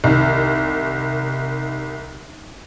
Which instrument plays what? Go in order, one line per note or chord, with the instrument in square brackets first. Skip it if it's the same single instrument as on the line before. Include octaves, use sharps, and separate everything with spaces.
[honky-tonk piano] C2 D#3